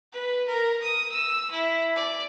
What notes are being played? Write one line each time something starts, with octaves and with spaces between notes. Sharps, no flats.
B4
A#4
D#6
E6
E4
D5